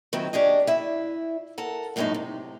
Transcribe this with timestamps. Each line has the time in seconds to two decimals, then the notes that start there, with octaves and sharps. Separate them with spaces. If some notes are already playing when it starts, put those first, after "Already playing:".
0.13 D#3 F#3 C4 C#4 E4
0.33 C#4 D4 G4 G#4 D#5
0.67 E4 E5
1.58 A4 A#4 F#5
1.96 F#2 A2 G#3 B3 C#4 D#4
2.14 C3